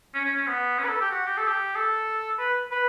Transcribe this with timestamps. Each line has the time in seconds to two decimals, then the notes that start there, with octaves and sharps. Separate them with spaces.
0.14 C#4
0.25 C#4
0.36 C#4
0.47 B3
0.78 C#4
0.85 B4
0.89 A4
1.01 G4
1.11 F#4
1.26 G4
1.37 A4
1.48 G4
1.75 A4
2.39 B4
2.71 B4